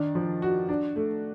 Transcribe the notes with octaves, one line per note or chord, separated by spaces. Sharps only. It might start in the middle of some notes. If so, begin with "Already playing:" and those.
Already playing: D#3 D4
F3
F#4
D4
A3